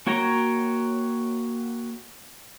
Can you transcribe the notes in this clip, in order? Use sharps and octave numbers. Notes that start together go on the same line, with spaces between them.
A#3 F#4 C#5 G5 A#5